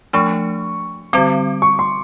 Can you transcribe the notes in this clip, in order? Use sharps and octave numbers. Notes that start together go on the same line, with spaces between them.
F3 A3 D4 C#6
D3 G3 C4 D6
C#6
C6